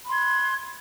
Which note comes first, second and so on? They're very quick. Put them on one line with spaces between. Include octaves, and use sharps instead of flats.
B5 C6 G#6 F#6